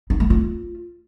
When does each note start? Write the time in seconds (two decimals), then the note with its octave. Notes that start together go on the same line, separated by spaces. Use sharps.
0.10 D#4
0.20 A3
0.30 F4